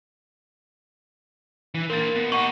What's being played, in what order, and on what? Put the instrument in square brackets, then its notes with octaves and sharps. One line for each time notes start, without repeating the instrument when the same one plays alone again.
[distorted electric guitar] E3
[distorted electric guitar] A#3 C5 [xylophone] A#4 A6
[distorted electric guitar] B2
[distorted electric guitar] D#4 G4 [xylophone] F#5 C#6